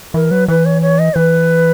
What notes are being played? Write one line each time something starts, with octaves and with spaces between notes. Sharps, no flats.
E3 A#4
F#3 B4
E3 B4
C#5
C#5
D#5
E3 B4